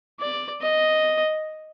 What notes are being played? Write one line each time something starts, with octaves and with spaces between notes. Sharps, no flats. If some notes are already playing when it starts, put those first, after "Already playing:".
D5
D#5